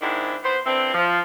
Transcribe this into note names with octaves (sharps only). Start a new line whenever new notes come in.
G#2 D#3 C4 D4 E4
B3 C5
D3 E3 C4
F3